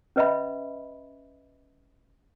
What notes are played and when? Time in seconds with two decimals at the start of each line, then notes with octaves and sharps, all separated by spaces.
0.16 C#4 B4 D#5 E5 B5